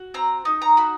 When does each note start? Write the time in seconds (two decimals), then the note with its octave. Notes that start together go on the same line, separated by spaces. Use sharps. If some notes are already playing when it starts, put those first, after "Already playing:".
Already playing: F#4
0.14 C4 A#5
0.45 D#4
0.62 A#5
0.77 F#4 B5